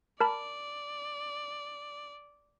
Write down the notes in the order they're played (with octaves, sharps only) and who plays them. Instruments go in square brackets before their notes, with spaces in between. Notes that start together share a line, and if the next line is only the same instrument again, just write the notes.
[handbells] A#4 A5 B5 [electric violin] D5